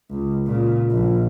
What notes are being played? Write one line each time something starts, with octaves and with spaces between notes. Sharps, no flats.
C#2
A#2 C#3
A#1